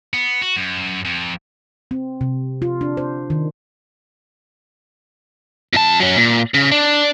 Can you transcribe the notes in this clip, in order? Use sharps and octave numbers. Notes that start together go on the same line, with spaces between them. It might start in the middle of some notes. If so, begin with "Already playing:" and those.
B3
F#4
F#2
F2
C4
C3
F4
D4
C5
D#3
F2 A5
F#3 C#4
A#2
C#3
D4